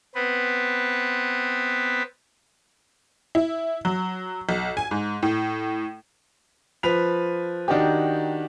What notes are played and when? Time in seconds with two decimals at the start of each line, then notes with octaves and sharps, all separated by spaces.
0.15 B3 C4 B4
3.35 E4
3.85 F#3
4.49 B1
4.77 G#5
4.91 G#2
5.23 A2
6.83 F3 B4 B6 F7
7.68 D#3 D4 D#4 F#4 G4